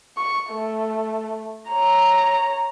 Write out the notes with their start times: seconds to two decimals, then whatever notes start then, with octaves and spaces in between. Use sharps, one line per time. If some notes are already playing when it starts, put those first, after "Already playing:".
0.17 C#6
0.50 A3
1.70 C#5 A#5